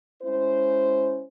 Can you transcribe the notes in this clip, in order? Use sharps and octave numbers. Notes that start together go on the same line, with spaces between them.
G#3 C#4 E4 C5